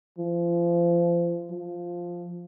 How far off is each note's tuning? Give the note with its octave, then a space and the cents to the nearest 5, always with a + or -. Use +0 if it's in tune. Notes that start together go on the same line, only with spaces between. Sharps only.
F3 -30
F3 +0